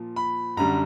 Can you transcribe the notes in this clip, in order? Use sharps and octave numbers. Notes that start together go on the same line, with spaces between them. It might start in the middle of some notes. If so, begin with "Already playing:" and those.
Already playing: A#2 F3
B5
F#2 D3 G3 A#5